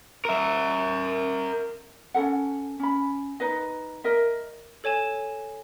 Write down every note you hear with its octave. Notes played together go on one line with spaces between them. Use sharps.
A#4 E5
C#4 D#4 A4 F#5
C#4 B5
D#4 B4 D#5
A#4 D#5 E5
A4 C#5 G#5 E7